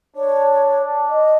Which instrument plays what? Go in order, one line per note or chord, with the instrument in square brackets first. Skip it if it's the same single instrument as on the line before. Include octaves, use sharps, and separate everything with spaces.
[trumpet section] D4 [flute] C#5
[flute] D#5